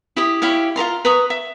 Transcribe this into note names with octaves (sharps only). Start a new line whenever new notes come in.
E4 G4 D#6
E4 G4 C#5 F5
F4 B4 A#5 C6
B4 A#5 C#6 D#6
E5